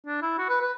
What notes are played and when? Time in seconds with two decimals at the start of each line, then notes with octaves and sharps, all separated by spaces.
0.07 D4
0.22 E4
0.39 F#4
0.49 B4
0.61 B4